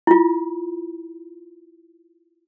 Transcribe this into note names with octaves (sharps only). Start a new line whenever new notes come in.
E4 F4